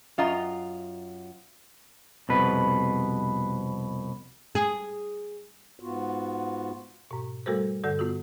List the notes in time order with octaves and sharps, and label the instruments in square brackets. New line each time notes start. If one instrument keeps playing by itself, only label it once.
[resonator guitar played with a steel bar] F#2 F4 D#5 A#5
[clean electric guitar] C2 F2 B2 B4
[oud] G#4
[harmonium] G#2 B3 F4 F#4
[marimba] G#2 B2
G3 A3 F#4 A4 A#4 C5
G2 D3 A4 D5 F#5 G6
B3 F4 F#4